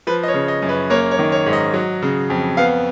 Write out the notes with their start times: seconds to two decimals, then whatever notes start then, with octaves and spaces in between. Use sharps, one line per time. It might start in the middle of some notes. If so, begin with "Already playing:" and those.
0.07 F3 B4
0.23 D#5
0.28 C#5
0.34 C#3
0.48 D#5
0.62 F#2
0.69 B4
0.90 A#3 C#5
1.11 C#5
1.19 D#3
1.32 C#5
1.46 G#2
1.53 D#5
1.74 F#3
2.02 C#3
2.30 F2
2.57 B3 F5